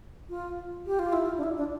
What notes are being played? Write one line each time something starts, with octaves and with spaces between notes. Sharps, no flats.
F4
G4
F4
E4
F4
D4
E4
D4